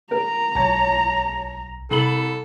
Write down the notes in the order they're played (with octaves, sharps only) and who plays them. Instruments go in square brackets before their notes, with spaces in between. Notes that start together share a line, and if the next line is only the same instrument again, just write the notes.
[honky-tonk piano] A#4 [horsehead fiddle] A#5
[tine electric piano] B1 [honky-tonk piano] C#5 A5
[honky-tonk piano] C2 B5 F#7 [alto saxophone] A4